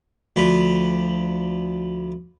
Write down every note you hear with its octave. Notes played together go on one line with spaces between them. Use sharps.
D2 F3 B4